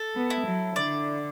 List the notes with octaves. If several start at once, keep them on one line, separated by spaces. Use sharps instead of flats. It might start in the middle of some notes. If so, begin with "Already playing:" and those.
Already playing: A4
B3
E4
F#3
D3 D5